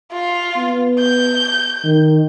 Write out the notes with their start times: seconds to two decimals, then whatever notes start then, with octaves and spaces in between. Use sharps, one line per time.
0.12 F4
0.57 B3
0.99 G6
1.84 D#3